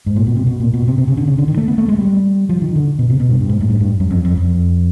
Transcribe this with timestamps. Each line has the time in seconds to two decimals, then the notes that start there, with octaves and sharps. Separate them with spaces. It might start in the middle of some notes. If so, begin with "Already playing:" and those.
0.06 G#2
0.16 A#2
0.27 B2
0.36 C3
0.47 B2
0.60 A#2
0.73 B2
0.88 C3
0.98 C3
1.08 C#3
1.17 D3
1.27 C#3
1.38 D3
1.48 D#3
1.57 A3
1.68 B3
1.78 A3
1.88 G#3
1.98 G3
2.49 F3
2.62 D#3
2.76 D3
2.99 B2
3.10 C3
3.20 B2
3.30 G2
3.40 G2
3.49 G#2
3.61 A2
3.70 G2
3.81 G2
4.00 F#2
4.10 F2
4.25 F2
4.37 F2